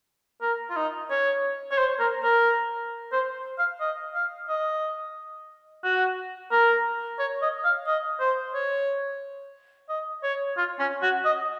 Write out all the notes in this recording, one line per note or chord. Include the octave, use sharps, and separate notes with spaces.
A#4
F4
D#4
C#5
C#5
C5
A#4
A#4
C5
F5
D#5
F5
D#5
F#4
A#4
C#5
D#5
F5
D#5
C5
C#5
D#5
C#5
F4
C#4
F#4
D#5